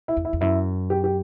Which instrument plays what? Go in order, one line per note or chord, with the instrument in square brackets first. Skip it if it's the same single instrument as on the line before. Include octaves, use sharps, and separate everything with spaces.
[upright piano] E4
[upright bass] E2
[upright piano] E4
[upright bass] E2
[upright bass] F#2 [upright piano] E4
[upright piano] G4
G4